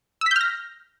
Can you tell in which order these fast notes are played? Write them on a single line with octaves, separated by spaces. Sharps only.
E6 B6 G6 F6 A#6